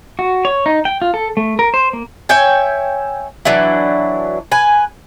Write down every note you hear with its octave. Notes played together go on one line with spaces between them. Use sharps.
F#4
C#5
D#4
G5
F4
A4
A3
A#4
C5
A#3
C#5 E5 G5 G#5
E3 F#3 D4 E4
B4 G#5